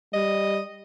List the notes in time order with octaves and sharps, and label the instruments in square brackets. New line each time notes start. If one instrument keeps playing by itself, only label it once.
[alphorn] G3 [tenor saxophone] D#5